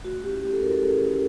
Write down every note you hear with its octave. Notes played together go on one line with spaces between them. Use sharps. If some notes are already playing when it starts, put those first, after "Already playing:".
A3 F#4
C#4 E4 G4
A3 G4
A4
C#4 E4 A#4
A4
A3 G#4
C#4 E4